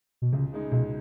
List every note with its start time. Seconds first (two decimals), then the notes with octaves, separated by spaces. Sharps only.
0.22 B2
0.33 C#2 C#3
0.53 C#3 G#3 D#4
0.72 C#2 B2